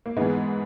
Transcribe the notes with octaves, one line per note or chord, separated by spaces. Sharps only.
A#3
G#2 E3 G#3 B3